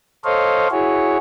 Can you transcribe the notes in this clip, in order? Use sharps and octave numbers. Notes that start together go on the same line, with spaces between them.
A4 C5 C#5 D#5 F5
E4 F#4 G#4 C#5